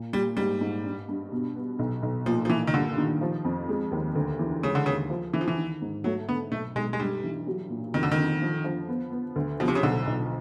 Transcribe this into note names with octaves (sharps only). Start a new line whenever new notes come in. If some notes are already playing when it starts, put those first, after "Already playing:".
Already playing: A#2
A#2 G3
G#2 G3
G#2
G2
G2
B2
B3
B1
B1
A#2 F3
F3
A#2 E3
D#3
G2 D3
D#3
F3
F2
G#3
D#2
D2
E3
C#3 G#3
D3
D#2 C#3
F3
D3 E3
F3
E3
D#3
G#2
F#3 A3
D3 B3
B1 A3
B1 G#3
G#3
G2 G3
E3
F#3
A#2
F2 D#3
D3
D#3
D3
F3
F3
B3
B3
D2
B2 F3
C3
C#3
B1 D3
B1